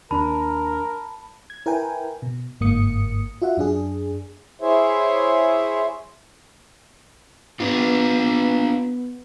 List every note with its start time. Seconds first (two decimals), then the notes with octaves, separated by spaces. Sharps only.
0.11 D#2 D4 A#4 A5 B5
1.50 G#6
1.66 E4 A#4 B4 G5 G#5
2.22 B2
2.61 G1 G#2 A#3 D#6 C#7
3.42 F4 F#4 E5 F#5
3.57 F#2 D4 G#4
4.61 E4 G#4 C5 C#5 E5
7.60 B3 D4 F4